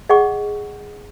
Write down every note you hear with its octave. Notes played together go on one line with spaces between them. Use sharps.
G#4 D#5 F#5 C#6